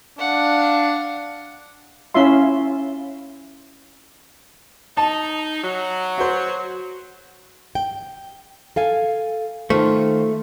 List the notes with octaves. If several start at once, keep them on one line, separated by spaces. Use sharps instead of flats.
D4 F5 F#5
C#4 E4 F4 E5 C6
D#4 A5
F#3
F#4 C5
G5
A4 F5 G#5
D#3 A3 F4 C5